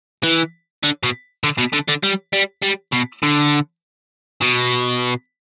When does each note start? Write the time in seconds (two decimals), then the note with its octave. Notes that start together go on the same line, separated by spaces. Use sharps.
0.23 E3
0.83 D3
1.03 B2
1.43 D3
1.58 B2
1.73 D3
1.88 D3
2.03 G3
2.33 G3
2.63 G3
2.93 B2
3.23 D3
4.42 B2